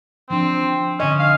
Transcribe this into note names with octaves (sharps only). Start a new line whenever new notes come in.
F3 C4 D4
D3 C#4 D#5
F5